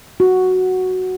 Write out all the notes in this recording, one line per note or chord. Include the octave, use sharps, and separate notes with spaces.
F#4